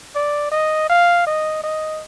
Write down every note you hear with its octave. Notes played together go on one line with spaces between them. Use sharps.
D5
D#5
F5
D#5
D#5